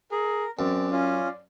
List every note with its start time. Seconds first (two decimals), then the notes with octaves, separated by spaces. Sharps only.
0.11 G#4 A#4
0.59 F#2 C4 D5
0.91 C#4 F4